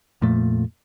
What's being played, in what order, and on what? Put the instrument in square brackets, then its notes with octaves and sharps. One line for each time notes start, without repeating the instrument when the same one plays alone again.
[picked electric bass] F2 A#2 F3 A3